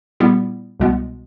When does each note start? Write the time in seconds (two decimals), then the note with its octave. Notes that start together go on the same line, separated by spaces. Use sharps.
0.20 A#2 G3 B3 E4 G4
0.80 C2 B2 G#3 B3